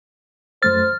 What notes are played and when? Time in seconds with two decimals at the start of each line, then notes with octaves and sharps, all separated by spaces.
0.63 F#2 A3 C5 F6 A6